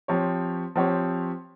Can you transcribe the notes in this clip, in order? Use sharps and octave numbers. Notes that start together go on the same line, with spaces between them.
F3 C4 G4 C#5
F3 C4 G4 C#5